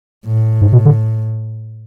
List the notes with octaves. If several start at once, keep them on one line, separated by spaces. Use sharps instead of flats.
A2
G#2
B2
D3